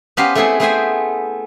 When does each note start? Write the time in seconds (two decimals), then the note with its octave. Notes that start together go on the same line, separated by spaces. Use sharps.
0.17 B3 C#4 G4 A#4 C5 F5
0.35 A3 B3 C4 E4 G#4 A4
0.60 A3 B3 G#4 C5 G5 G#5